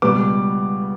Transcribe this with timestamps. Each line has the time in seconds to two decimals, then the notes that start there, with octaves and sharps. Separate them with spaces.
0.02 C#2 B2 G3 B3 D6